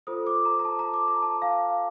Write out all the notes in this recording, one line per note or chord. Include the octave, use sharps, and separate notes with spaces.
F4 A4 C5 D#6
D6
A#5
A#5
A5
A#5
D6
A#5
A5
F5